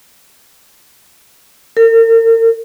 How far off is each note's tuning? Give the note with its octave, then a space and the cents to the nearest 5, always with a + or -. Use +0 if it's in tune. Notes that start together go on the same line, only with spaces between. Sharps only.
A#4 -40